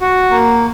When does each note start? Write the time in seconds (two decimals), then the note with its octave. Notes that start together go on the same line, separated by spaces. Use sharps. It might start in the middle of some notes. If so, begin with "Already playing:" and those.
0.01 F#4
0.30 A#3